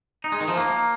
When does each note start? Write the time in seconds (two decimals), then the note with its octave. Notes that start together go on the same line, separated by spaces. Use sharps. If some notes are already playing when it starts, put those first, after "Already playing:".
0.24 D#4
0.32 G#3
0.40 D#3
0.48 F3
0.57 A#3